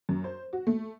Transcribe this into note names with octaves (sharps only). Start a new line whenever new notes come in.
F#2
C5
F#4
A3